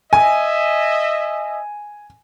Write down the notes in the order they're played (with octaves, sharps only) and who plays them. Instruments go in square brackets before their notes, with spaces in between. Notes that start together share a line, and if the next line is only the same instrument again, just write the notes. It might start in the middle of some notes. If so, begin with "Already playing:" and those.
[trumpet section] D#5 E5 [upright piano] G#5